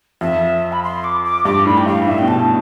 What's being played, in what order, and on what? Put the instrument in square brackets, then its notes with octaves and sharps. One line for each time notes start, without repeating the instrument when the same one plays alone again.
[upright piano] F2 [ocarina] E5
[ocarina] B5
C6
D6
D6
[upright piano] G2 [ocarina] D6
[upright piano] A2 [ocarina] B5
[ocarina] G5
[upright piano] G2 [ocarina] F5
[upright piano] A2 [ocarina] E5
[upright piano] B2 [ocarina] G5
[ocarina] A5
[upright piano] A2